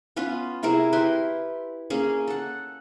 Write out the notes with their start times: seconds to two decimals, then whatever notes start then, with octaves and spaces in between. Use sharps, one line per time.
0.16 B3 C#4 F4 B4
0.63 C3 E4 G#4 A#4
0.93 E4 G4 B4 C6
1.90 A#3 C#4 G#4
2.28 A4 F#5